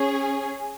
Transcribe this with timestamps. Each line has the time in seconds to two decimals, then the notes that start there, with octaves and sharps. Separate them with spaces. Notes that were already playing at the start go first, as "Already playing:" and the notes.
Already playing: C#4 G#4